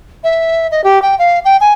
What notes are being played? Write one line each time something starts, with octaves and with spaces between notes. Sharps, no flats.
E5
D#5
G4
G5
F5
G5
G#5